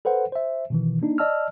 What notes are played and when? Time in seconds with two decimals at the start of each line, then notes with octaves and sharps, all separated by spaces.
0.05 A4 B4 C5 F#5
0.32 C5 E5
0.70 B2 D#3 E3
1.02 A#3 D4 D#4
1.18 D5 D#5 A5 E6 F6